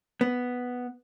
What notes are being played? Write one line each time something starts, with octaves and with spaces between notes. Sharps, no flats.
B3